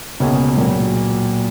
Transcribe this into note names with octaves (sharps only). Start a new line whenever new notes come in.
C#2 B2 A#3 C#4 G#4
A#2 F#3 A#3